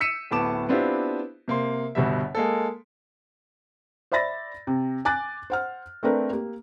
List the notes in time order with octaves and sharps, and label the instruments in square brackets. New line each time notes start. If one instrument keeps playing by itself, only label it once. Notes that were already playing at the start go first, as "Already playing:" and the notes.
[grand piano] E6 B6 C#7 D#7 E7
D1 A2 B3 A5 D6 E7
B3 C4 D4 E4 F4 G4
C3 A#3 C6
G1 B2 G3 E5
G#3 A#3 A4
[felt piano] C5 D5 E5 B5 A6 A#6
C3
G#5 D6 F#6 A6
C5 F#5 F6
A3 C4 D4 A#4 B4
A#3 G4